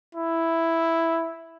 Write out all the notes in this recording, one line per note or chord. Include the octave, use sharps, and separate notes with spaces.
E4